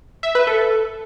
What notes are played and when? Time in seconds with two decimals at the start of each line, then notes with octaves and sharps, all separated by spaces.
0.23 E5
0.35 B4
0.47 A4